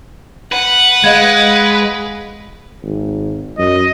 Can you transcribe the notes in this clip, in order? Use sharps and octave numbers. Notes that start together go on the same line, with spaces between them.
B4 F#5
G#3 D#5 F5 G#6
G#1
F#2 D#5